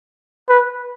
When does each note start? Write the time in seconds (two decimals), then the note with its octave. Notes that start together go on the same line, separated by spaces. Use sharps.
0.49 B4